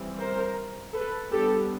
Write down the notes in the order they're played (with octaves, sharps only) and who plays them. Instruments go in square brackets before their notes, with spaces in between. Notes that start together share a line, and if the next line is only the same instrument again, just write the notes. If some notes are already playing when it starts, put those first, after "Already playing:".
Already playing: [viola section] E3 G3 C4
A#4 C5
A4 B4
G3 B3 D4 G4 A4